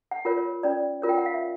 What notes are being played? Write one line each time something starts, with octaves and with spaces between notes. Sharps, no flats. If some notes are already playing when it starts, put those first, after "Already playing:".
F#5
F4 A#4 C#5
C#5
C#4 D5
F4 A#4 C#5
G5
F#5
F5
E5